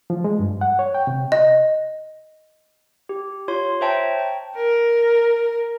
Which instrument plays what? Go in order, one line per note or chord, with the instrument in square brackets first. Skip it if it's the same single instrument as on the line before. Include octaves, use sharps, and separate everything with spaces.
[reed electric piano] F3
G#3
G2
F#5
C#5
G5
C3
[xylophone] D#5
[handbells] G4
F4 C#5 C6
C5 C#5 E5 G5 A5 A#5
G5
[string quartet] A#4